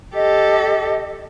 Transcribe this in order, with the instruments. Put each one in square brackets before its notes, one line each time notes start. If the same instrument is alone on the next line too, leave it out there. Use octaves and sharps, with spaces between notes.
[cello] G4 A4 [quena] D#5